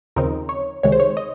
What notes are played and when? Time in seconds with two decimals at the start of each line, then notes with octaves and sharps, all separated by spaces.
0.16 D#2 C#3 F3 C4 D#4 A#4
0.49 C#5
0.83 C#2 C3 D#3 G#3 C#5
0.92 C5
1.00 C#5
1.17 D#5